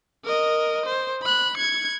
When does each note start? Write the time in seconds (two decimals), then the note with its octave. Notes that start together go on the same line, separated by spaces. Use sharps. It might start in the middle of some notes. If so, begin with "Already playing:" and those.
0.25 A#4 D#5
0.86 C5
1.22 B5 F#6
1.57 G#6 C#7